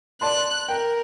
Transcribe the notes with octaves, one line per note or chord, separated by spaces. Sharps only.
D5 A5 C6 F#6
A#4 G5